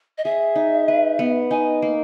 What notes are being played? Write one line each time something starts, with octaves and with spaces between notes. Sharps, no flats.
D#5
G#4 E5
D#4
B4
B3
D#4 G#5
A#3